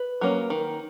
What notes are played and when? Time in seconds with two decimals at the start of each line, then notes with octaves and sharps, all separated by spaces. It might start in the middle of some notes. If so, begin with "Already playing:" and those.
Already playing: B4
0.21 F#3 A#3 C#4
0.50 D#3